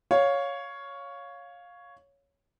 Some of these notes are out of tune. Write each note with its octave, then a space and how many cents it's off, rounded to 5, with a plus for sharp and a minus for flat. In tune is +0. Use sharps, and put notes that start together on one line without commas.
C#5 +5 F5 +10